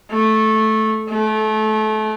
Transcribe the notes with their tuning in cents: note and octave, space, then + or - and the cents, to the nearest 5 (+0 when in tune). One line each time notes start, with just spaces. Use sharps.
A3 -10
A3 -25